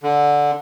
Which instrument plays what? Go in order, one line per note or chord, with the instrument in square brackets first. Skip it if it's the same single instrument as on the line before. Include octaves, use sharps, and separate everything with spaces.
[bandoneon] D3